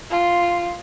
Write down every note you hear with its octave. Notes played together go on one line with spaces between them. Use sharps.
F4